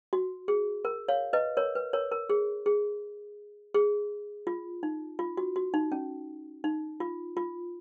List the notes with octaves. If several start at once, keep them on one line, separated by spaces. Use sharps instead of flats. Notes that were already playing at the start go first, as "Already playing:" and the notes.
F#4
G#4
A#4
C#5 F5
B4 D#5
A#4 C#5
B4
A#4 C#5
A#4
G#4
G#4
G#4
F4
D#4
F4
F#4
F#4
D#4
C#4
D#4
F4
F4